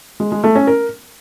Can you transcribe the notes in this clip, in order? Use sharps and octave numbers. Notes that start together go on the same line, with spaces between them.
G#3
G#3
A3
C#4
A#4